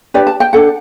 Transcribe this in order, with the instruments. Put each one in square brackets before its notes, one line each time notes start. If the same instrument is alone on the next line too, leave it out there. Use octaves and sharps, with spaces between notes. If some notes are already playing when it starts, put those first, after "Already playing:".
[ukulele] D4 G4 B4 D5
A5
G5
D4 A4 F#5